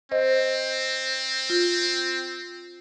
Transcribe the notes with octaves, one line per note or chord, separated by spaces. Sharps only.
C4 C5 D#5
F4